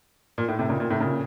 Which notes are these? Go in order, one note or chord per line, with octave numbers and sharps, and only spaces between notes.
A#2
A2
A2 C3
A#2 C#3
A#2
A2 C3
A#2 C#3